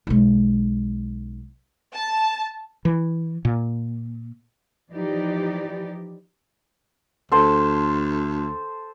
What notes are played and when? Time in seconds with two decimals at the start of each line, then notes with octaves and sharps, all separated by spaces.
0.07 B1 G#3
1.94 A5
2.85 E3
3.45 A#2
4.93 E3 F3 D#4 G4 D5
7.32 D2 A4 C5 A5